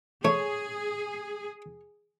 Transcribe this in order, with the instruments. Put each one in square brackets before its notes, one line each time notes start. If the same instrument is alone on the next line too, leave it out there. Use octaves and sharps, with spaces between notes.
[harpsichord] A3 [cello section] G#4 [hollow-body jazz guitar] C#5